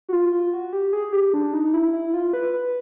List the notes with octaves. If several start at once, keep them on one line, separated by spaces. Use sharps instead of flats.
F#4
F4
F4
F#4
G4
G#4
G4
D4
D#4
D#4
E4
E4
F4
B4
B4